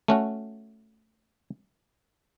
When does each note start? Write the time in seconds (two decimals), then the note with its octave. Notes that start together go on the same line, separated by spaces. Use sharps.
0.08 A3 C#4 F#4